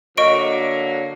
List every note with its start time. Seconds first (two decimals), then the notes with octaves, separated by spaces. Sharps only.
0.17 D3 F#3 A#3 D#5 C#6 D7